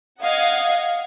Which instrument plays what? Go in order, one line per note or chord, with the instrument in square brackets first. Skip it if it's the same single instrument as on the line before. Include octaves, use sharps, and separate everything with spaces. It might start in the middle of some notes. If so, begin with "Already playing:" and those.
[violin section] D#5 F5 F#5 G#6